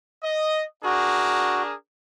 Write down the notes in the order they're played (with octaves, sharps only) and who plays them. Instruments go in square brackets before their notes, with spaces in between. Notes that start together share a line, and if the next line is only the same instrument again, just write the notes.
[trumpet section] D#5
[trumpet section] D4 G#4 A#4 [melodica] F#4